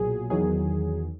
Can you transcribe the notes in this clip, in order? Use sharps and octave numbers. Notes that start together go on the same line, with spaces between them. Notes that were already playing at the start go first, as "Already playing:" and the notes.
Already playing: B1 A#2 F#3 G#4
E2 D#3 F#3 G#4